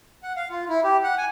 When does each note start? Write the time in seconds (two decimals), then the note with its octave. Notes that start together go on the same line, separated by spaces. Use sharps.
0.23 F#5
0.36 F5
0.50 F4
0.69 E4
0.84 G4
1.04 F#5
1.18 G#5